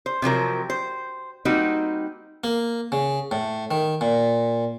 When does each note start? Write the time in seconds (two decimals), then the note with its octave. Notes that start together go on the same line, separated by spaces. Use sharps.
0.06 C5
0.22 C3 F3 F#3 A#4
0.70 C5
1.45 G3 A#3 C4 D#4 F#4
2.44 A#3
2.92 C#3
3.31 A2
3.71 D#3
4.01 A#2